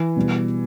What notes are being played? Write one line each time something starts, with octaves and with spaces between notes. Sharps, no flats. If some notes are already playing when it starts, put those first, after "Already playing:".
Already playing: E3
B2 G3 B3